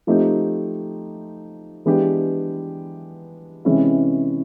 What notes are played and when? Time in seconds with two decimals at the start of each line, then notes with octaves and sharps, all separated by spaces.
0.07 F3 A3 C4 D#4 G4
1.86 E3 G#3 B3 D4 G4
3.65 C3 E3 G#3 C#4 E4